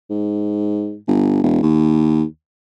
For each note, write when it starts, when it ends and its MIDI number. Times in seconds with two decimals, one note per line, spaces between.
0.10 0.97 44
1.07 1.38 31
1.43 1.61 28
1.63 2.23 39